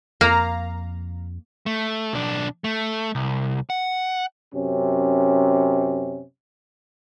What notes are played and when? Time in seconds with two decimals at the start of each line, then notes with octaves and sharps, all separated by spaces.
0.21 F2 A#3 F5 A#5
1.66 A3
2.13 B1 D4
2.64 A3
3.15 C2
3.70 F#5
4.53 F#2 C3 C#4